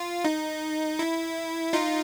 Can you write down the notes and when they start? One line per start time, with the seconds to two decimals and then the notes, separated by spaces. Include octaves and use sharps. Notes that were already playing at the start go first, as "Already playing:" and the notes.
Already playing: F4
0.25 D#4
0.99 E4
1.73 D#4 F4